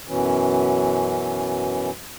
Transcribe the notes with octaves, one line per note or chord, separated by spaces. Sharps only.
F#2 B2 E3 C#4